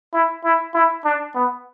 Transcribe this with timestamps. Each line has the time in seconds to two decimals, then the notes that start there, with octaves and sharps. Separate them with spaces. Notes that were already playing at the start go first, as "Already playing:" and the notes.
0.13 E4
0.44 E4
0.74 E4
1.05 D4
1.35 B3